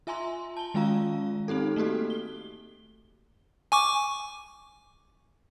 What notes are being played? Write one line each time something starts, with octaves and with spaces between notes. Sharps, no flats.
F4 E5 G#5 A#5 C6
A5 G7
D#3 G#3 C#4 F4 F5 A#5
C4 D#4 G4 A4
A3 A#3 F#4 G4 A4
G7
G#5 C#6 D6